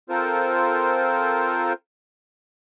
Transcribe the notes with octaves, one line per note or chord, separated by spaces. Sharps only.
C4 F4 A4 A#4 C5